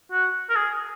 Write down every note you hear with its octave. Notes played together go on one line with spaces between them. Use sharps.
F#4
A#4
G#4